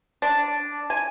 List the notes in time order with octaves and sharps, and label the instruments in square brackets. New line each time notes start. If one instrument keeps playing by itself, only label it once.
[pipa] D4
G#5